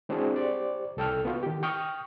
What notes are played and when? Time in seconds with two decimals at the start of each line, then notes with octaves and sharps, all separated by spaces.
0.09 G#3 C4 D4 E4 F#4 G#4
0.36 G4 C5 D5
0.97 C2 A4 G5 F6
1.25 B3 F4 F#4
1.43 D#3 G4
1.63 G5 C#6 D#6 F6